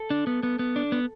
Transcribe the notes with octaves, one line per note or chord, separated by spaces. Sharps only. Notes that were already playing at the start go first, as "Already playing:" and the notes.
Already playing: A4
D4
B3
B3
B3
D4
B3